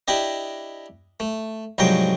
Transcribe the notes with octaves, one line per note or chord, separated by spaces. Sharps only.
D4 E4 G4 D#5
A3
C2 G#2 F3 F#3 G5 A#5